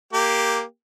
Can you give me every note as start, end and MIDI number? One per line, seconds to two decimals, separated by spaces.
0.13 0.63 58
0.13 0.63 67